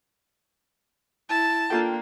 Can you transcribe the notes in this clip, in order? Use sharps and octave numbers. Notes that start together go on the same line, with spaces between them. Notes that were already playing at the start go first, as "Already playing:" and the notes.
E4 A5
A#3 D4 F4 A4 G5